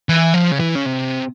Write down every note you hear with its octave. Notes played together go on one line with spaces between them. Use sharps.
E3
F3
C#3
E3
C#3
C3